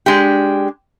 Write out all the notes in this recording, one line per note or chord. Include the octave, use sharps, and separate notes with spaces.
G#3 D4 G4